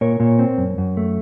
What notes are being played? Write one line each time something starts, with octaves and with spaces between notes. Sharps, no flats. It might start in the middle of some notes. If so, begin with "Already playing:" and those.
A#2 A#4 C#5
A#2
C4
F#2
F#2
A3